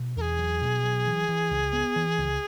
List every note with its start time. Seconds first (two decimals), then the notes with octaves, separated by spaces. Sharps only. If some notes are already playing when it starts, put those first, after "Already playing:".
Already playing: B2
0.16 E2 A#4
0.21 G#4
0.39 F#3
0.61 B2
0.83 F#3
1.06 E3
1.29 E3
1.51 C#2
1.73 B3
1.96 E3
2.18 C#2